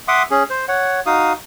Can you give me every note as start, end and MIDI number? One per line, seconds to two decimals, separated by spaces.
0.08 0.23 76
0.08 0.23 78
0.08 0.23 84
0.08 0.23 86
0.08 0.23 87
0.31 0.43 61
0.31 0.43 68
0.50 0.65 72
0.68 1.00 73
0.68 1.00 78
1.06 1.33 63
1.06 1.33 66
1.06 1.33 77
1.06 1.33 87